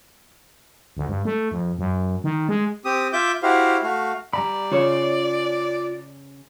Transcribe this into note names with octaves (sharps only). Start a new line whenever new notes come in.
D2
G2
A3
F2
F#2
D#3
G#3
C4 G4 D#6
F4 E5 D6 G6
E4 F#4 G4 C5 F5
A3 F#4 F5
G3 D5 A#5 B5
C#3 F4 C#5